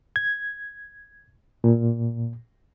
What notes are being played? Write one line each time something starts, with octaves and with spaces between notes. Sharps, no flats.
G#6
A#2